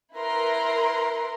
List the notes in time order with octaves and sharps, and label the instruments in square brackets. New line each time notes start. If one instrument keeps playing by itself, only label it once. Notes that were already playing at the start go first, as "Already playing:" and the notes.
[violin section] E4 A#4 B4 A#5 C6